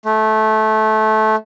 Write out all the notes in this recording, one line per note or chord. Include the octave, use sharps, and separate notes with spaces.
A3